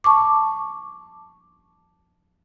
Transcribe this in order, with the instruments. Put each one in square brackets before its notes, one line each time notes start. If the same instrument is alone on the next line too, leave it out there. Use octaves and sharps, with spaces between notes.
[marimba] A5 C#6 D6